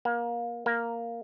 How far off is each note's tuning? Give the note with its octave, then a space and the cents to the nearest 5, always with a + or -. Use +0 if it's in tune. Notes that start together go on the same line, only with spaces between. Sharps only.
A#3 +25
A#3 +0